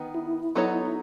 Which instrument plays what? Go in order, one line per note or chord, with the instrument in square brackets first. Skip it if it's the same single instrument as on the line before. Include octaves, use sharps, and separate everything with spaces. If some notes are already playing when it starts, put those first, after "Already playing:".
Already playing: [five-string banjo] D#3 B3
[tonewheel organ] E4
[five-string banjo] F#3 B3 D#4 A4 C#5
[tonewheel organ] E4